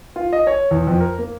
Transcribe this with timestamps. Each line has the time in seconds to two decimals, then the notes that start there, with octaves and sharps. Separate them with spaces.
0.16 F4
0.33 D#5
0.47 C#5
0.71 E2
0.87 F2
1.01 A#4
1.18 A#3